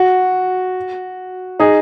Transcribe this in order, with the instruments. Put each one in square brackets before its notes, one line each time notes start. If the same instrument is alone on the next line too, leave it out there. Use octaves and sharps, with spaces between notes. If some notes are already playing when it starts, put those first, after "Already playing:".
Already playing: [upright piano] F#4
D#4 G#4